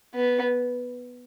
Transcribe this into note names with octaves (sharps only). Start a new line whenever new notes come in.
B3